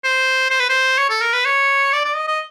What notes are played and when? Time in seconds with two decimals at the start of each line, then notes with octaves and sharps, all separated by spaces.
0.04 C5
0.51 C5
0.60 B4
0.69 C5
0.98 C#5
1.10 A4
1.21 A#4
1.33 B4
1.46 C#5
1.93 D5
2.05 D5
2.16 D#5
2.28 D#5